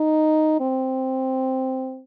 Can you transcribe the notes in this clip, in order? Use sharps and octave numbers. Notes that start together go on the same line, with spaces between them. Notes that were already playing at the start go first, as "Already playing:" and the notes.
Already playing: D#4
C4